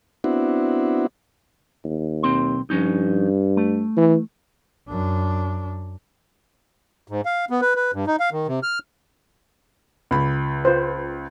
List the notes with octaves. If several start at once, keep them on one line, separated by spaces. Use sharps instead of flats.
B3 C4 D4 E4 F#4
D#2
B1 C4 C6
G2 F3 C#4 D#4
A3
E3
F#2 D4
G#2
F5
B3
B4
B4
G2
D#4
F5
D#3
C3
F6
C#2 B5
F4 B4 C5